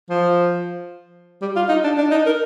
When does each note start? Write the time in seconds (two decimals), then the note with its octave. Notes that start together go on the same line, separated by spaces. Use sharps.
0.10 F3
1.42 G3
1.56 F4
1.69 D#4
1.84 D4
1.98 D4
2.11 D#4
2.26 A#4